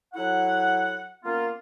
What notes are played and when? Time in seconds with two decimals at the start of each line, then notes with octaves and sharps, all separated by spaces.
0.14 F#3 E4 A4 F#5
1.24 A#3 B3 C#4 F4